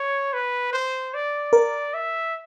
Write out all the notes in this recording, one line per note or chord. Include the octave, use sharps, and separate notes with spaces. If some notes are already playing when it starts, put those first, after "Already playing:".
Already playing: C#5
B4
C5
D5
A#4
E5